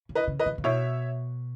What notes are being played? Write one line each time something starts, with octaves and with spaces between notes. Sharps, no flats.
C#3
B4 D#5
C#3
B4 D#5
C#3
C#3
B2 C#5 E5